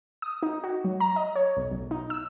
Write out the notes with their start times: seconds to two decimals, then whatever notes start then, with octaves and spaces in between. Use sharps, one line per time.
0.22 D#6
0.43 D#4
0.64 F#4
0.84 F#3
1.00 A#5
1.16 D#5
1.36 C#5
1.57 B1
1.71 B1
1.91 D#4
2.10 E6